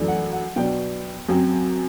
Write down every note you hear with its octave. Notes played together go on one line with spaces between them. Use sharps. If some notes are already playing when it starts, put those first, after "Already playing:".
Already playing: F#2 E3 A3 D4
F#5
F#5
B2 F#3 B3 D4 G5
F#2 F#3 C4